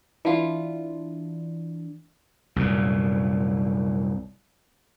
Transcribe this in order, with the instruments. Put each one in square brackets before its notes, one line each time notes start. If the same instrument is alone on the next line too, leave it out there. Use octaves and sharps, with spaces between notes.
[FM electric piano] E3 D4 [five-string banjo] E4 F4
[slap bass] C2 F#2 A#2